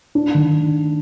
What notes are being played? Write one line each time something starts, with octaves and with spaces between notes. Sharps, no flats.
D4
D#3